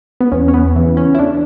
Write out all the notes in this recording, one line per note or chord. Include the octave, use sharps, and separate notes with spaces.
B3
E2 C#4
C#4
B3
C#3 E3
C#4
E4
E2 D4